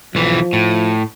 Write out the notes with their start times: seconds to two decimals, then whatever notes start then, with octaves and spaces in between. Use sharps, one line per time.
0.15 B1 E3 F3
0.53 A2